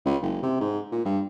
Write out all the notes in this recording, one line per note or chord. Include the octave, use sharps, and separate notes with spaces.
C#2
F#1
C3
G#2
A#2
G2